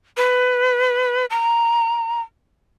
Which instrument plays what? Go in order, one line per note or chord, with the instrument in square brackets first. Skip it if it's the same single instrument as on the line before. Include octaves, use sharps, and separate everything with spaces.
[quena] B4
A#5